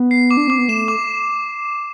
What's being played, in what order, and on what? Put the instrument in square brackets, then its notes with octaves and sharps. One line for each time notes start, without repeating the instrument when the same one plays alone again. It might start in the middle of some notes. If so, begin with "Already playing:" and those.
Already playing: [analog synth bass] B3
[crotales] C7
D6
[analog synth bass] D4
[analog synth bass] C4 [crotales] D6
[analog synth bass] B3
[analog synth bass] A3 [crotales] E7
[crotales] D6